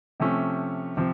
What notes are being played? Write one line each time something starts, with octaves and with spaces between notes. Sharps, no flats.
C3 F3 A3 C#4
C3 F3